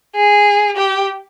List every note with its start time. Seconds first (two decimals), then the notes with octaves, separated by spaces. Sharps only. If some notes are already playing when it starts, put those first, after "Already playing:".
0.16 G#4
0.77 G4